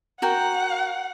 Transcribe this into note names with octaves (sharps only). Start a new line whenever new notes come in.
F#4 A#4 F#5 G5